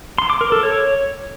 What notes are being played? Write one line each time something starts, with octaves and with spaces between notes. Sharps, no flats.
C6
D6
A#4
A4
C#5